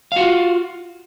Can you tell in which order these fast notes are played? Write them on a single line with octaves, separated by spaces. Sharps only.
F5 F#4 F4